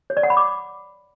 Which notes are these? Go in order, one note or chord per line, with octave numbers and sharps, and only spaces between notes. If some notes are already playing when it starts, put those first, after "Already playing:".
C#5
D5
F#5
B5
D6